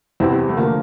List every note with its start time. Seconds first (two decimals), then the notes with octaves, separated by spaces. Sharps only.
0.20 E2 C3 E3 C4 E4
0.49 A3
0.57 D3 F3 A#3